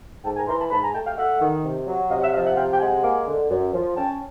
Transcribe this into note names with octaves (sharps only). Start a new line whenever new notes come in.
G#2 G5 A5
G#5 A#5
E3 A#5 C6
A5 B5
G#2 A5 B5
G#5 A#5
A3 G5 A5
F5 G5
A3 E5 F#5
D#3
C3
F#3
C3 D#5 F5
E5 F#5
F3 D#5 F5
E5 F#5
C3 F5 G5
G5
G#3 F#5 G#5
A#3
D3
F#2
F3
C#4 G5 A5